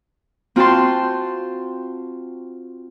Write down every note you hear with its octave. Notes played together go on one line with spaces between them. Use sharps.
C4 F4 F#4 G5 A5 C6